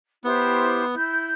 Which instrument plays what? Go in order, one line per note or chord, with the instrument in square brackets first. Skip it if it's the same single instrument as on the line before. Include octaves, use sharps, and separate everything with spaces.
[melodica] B3 [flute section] E4 G4 C5
[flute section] E4 G6